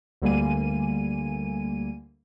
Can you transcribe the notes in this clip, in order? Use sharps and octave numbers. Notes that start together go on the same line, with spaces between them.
D2 D3 G3 A#3 G#5 D#7